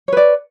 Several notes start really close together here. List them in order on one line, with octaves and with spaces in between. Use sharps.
C#5 B4 D5